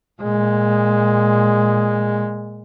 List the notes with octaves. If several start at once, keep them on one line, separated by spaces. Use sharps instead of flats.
A#2 G#3